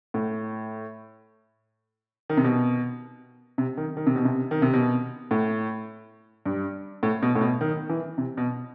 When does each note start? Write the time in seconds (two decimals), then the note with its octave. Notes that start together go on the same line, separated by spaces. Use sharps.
0.14 A2
2.29 D#3
2.37 C3
2.44 B2
3.58 C3
3.77 D#3
3.97 D#3
4.06 C3
4.15 B2
4.25 C3
4.51 D#3
4.62 C3
4.73 B2
5.31 A2
6.46 G2
7.03 A2
7.22 B2
7.35 A2
7.41 B2
7.61 D#3
7.89 E3
8.18 C3
8.37 B2